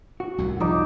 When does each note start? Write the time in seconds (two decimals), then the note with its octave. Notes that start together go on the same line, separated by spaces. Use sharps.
0.20 F#4
0.38 C2 F#2 A2
0.60 F3 D#4 D6